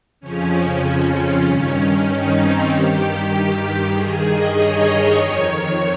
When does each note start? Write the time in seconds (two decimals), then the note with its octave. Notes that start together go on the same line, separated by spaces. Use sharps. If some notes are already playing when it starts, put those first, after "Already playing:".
0.20 F2 C#3 F3 C#4
1.45 G2 D#3
2.07 D#4
2.38 C4
2.69 G2 D#3 G4
2.99 G4
3.93 G2 D#3 G#4
4.24 D#5
4.55 C#5
5.17 F2 D#3